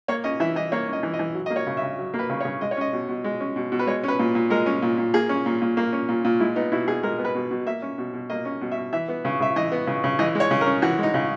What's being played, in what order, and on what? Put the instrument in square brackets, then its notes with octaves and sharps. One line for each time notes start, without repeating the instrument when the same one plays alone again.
[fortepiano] A#3 C#5
C#4 D#5
E3 E5
E3 D#5
A#3 C#5
C#4 D#5
E3
D#5
E3
F#3
A#3 D#5
C#5
C#3
E5
C#3
F#3
A#3
B4
C#3
C#5
C#3
G#3 D#5
C#5
C#4 D#5
B2
B2
G#3
C#4
B2
B2
B4
G#3 C#5
C#4 B4
A#2
A#2
G#3 A#4
C#4
A#2
A#2
A#3 G#4
C#4
A#2
A#2
A#3
C#4
A#2
A#2
G#3 E4
B3 D#4
B2 E4
B2 G#4
G#3 A#4
B3
B4
B2
B2
A#3 E5
C#4
B2
B2
A#3 D#5
C#4
B2
E5
B2
E3 E5
B3
C#3
C#3 E5
E3 D#5
B3
C#3
C#3
E3 D#5
G#3
C#5
C#3
A#4
C#4
E3 F#4
G#3 D#4
C#3